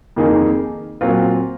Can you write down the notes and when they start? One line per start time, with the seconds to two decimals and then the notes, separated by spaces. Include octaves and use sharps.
0.16 F2 D#3 A#3 D#4 G#4
1.01 A#2 F#3 C4 F4